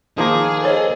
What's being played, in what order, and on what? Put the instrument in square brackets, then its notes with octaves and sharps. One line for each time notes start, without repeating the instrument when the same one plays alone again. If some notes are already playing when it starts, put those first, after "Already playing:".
[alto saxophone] D#3 [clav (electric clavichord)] F3 A#3 [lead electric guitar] G#4
[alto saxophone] A4 [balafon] C5 C#5 D#5